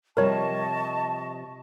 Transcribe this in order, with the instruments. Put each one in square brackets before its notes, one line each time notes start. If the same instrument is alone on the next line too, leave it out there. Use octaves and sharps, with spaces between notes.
[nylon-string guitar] C3 F3 G3 [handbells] A#4 C#5 [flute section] D#5 A5 C#6